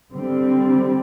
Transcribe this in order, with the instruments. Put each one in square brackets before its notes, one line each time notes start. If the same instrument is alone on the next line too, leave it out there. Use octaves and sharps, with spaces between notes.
[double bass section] D3 G3 C4